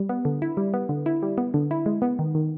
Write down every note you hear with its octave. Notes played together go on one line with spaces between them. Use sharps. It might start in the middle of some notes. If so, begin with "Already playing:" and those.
Already playing: G3
B3
D3
E4
G3
B3
D3
E4
G3
B3
D3
E4
G#3
B3
D#3
D#3